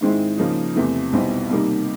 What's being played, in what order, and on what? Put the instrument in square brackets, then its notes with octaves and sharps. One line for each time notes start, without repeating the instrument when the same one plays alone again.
[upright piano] G#2 D#3 G#3 C4 E4
C#3 F3 A#3 D#4
E2 C3 E3 A3
B1 B2 G3 C4 E4
C3 D#3 G3 A#3 D#4